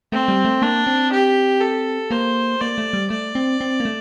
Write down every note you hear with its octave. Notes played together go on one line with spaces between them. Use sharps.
A3 C4
G3
A3
A#3 D4
C4
G4
A4
A#3 C5
A#3 D5
A3
G3
A3 D5
C4
C4
A#3
A3